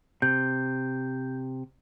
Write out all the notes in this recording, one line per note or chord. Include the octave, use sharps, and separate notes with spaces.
C3 G6